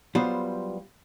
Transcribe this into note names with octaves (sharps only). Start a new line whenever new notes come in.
F#3 G3 B3 F4 C5